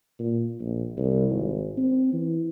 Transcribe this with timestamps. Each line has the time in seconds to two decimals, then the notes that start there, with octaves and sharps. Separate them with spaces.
0.19 A#2
0.61 A#1
0.98 C2
1.31 G#1
1.77 C4
2.13 E3